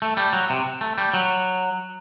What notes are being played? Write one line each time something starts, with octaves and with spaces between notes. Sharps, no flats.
A3
G3
F#3
C3
A3
G3
F#3